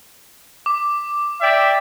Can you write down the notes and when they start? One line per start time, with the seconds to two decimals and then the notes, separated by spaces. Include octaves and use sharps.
0.66 D6
1.41 D5 E5 G5